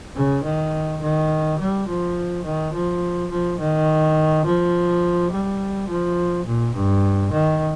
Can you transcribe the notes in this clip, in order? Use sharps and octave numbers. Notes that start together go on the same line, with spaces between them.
C#3
D#3
D#3
G3
F3
D#3
F3
F3
D#3
F3
G3
F3
A#2
G2
D#3